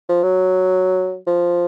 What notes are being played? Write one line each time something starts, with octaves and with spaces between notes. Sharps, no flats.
F3
F#3
F3